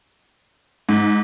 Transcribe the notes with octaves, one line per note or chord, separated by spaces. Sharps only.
G#2